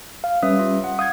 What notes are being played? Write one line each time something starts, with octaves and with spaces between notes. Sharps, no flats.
F5
G3 C#4 B4 E5 D#6
F4
F#5
F5 D#6 G6 G#6